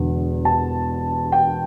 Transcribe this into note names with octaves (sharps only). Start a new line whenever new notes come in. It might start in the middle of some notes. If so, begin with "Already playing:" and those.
Already playing: E1 E2 D3
A5
G5